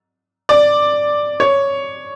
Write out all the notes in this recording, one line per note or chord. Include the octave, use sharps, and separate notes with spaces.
D5
C#5